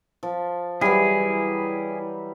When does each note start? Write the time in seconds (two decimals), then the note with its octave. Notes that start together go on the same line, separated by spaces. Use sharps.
0.23 F3
0.81 E3 F#3 G3 E4 G#4